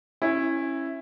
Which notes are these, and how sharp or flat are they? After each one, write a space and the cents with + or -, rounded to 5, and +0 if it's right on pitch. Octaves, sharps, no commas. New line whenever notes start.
C#4 -25 E4 +0